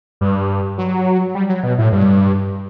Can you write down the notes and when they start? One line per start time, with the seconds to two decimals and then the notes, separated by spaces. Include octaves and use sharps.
0.21 G2
0.78 F#3
1.35 G3
1.49 F#3
1.63 B2
1.78 A2
1.92 G2